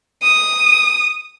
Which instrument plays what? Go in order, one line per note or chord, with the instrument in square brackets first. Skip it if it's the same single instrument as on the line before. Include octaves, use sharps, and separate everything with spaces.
[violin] D#6